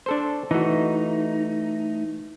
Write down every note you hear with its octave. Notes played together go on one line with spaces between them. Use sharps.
D4 A4 C5
E3 A3 D#4 F#4